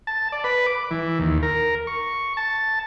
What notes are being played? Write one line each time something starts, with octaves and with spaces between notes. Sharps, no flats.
A5
D5
B4
D6
E3
D#2
A#4
C#6
A5